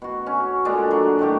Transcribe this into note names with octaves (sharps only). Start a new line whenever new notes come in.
B2 F#4
C#4
A#2 D3 G#3 D4
F#3
A2 D#3 A3 G4